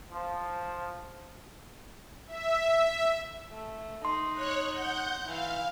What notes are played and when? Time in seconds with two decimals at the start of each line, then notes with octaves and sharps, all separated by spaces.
0.11 F3
2.27 E5
3.52 A3
4.05 D#4 C6
4.33 C#5 F#6
4.73 F#5 G6
5.25 E3 F5